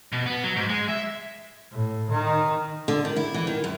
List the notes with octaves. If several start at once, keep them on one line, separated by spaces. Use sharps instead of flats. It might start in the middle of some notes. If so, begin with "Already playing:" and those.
B2
B3
F#3
G#2
G#3
E5
A2
D#3
D3
D#3
E4
E3
D#3
F#2